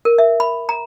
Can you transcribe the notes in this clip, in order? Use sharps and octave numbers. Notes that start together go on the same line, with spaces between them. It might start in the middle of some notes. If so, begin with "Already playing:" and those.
A#4
E5
B5
A#5